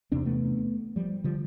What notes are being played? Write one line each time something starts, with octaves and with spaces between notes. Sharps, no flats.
E2 C3 C4 D4
A3 B3
F3 G3
D3 F3 G3